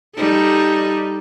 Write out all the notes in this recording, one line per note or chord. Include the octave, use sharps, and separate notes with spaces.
G3 D#4 A4